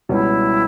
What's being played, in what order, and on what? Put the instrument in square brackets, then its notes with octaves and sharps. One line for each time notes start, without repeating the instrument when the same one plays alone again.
[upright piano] C#2 B2 G3 C#4 [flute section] E4